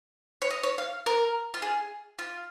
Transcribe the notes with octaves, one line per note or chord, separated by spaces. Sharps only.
C#5
D#5
C#5
F5
A#4
F4
G#4
F4